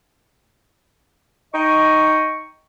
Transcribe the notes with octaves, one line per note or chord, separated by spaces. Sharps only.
D#4 D#5 G5 C#6